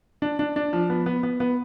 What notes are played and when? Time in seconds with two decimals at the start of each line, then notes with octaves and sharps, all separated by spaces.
0.22 D4
0.39 D4
0.56 D4
0.73 F3
0.90 B3
1.06 B3
1.23 B3
1.40 B3